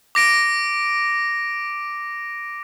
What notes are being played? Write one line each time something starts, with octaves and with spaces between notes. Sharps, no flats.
D6 A#6 D7